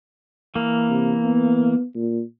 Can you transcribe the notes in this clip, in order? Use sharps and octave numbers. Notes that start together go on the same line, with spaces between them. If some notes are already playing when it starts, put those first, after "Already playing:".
E3 A#3
C3
B3
A#2